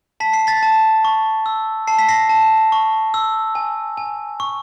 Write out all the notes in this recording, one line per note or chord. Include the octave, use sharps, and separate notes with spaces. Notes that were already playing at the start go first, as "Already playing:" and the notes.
A5 B6
C7
A6 B6
A5
C#6
E6
A5 C7
B6
A#6 C7
A5
C#6
E6
G#5
G#5
C#6